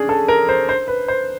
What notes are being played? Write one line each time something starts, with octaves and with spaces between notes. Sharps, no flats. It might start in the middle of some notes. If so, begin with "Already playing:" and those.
Already playing: C#4 D4 G#4
A4
A#4
C5
C5
B4
C5